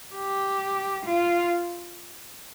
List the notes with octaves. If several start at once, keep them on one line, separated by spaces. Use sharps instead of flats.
G4
F4